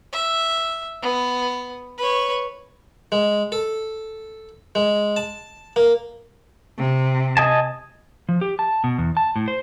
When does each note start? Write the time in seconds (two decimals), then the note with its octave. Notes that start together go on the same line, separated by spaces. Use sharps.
0.13 E5
1.02 B3
1.98 B4 C#5
3.12 G#3
3.52 A4
4.75 G#3
5.16 A5
5.76 A#3
6.79 C3
7.37 D#5 G#5 A5
8.29 F3
8.41 G4
8.59 A5
8.84 B2
8.98 E2
9.17 A5
9.36 A2
9.48 C5